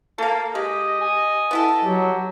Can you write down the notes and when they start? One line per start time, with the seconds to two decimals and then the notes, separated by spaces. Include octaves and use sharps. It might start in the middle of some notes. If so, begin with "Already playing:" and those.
0.18 A#3 A4 F5
0.55 G#3 G4 D#5
1.01 G#5
1.51 B3 E4 A4
1.85 F#3 G4